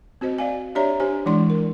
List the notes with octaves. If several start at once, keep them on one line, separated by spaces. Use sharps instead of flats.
C4 F#4 C5 D#5
D5 F5 G#5
D4 G4 C#5 D5 E5 A#5
D4 G4 C5 G#5
E3 G#3 D4 E4 D5 C6
A#4